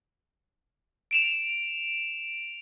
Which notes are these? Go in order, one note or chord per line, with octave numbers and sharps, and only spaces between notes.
D7 E7 F7